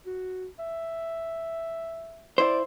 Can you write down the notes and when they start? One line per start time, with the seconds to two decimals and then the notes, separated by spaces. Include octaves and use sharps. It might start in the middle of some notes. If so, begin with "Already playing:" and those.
0.06 F#4
0.59 E5
2.38 E4 C5 D5